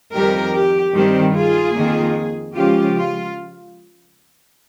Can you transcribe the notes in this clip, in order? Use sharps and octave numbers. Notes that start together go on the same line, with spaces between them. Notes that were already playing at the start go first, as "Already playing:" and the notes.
F2 D#3 G3 G4 A#4
G4
G2 D#3 G3 C4 G4
F4 G#4
F2 D#3 A#3 F4
C#3 F3 G#3 C#4 F4 G4
F4